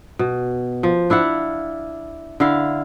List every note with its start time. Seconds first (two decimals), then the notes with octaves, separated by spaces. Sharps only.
0.19 B2
0.83 F3
1.10 D4 E4 F5 F#5
2.40 D3 E4 F5